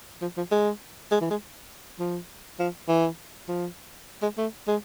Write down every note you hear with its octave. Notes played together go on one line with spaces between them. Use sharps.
F3
F3
G#3
G#3
E3
G#3
F3
F3
E3
F3
G#3
A3
G#3